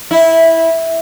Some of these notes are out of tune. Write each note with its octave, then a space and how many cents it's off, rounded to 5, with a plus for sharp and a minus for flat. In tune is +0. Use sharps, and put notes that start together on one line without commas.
E4 -10